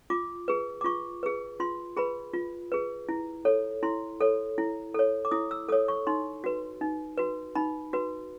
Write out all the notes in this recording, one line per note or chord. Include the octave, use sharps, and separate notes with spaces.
F4 D6
G#4 B4
D6
F4 C#6
G#4 B4
F4 C6
G#4 B4 B5
F4
G#4 B4
E4
A4 C#5
E4 C6
A4 C#5
E4
A4 C#5
D6
E4 D#6
E6
A4 C#5 D#6
C#6
D#4 C6
F#4 B4
D#4
F#4 B4
D#4 B5
F#4 B4